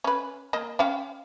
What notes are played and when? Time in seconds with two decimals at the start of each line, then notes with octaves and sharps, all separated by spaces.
0.04 C#4 B4
0.53 A#3 D#5
0.79 C#4 F5 G5